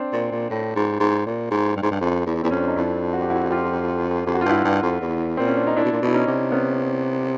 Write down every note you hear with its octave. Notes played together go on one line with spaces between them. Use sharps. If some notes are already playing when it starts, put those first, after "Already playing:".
Already playing: C4 D4
A#2
A#2
A2
G#2
G#2
A#2
G#2
G2
G#2
G2
F2
E2
E2 C4
F2 C#4
D4
D#4
F2 D4 E4
F#4
G4
E4 F#4
F#4
F4 G4
F2 G4
F#4
F4
G2 E4 F#4
G2
F2
E2
A#2 C4
C#4
D4
D#4
A#2 D4 E4
B2
A#2
B2 E4
C#4 D#4
C3
B3 C#4